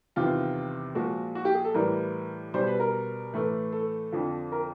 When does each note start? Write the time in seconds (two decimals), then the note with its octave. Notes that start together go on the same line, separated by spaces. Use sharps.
0.16 E2 C3 D#3 F4
0.95 A#2 F3 G#3 F#4
1.35 F#4
1.45 G4
1.54 G#4
1.65 A4
1.74 A2 E3 G3 A#4
2.54 B2 G3 C5
2.67 B4
2.80 A#4
3.33 A2 E3 A3
3.72 A4
4.12 F2 D3 F3
4.52 A#4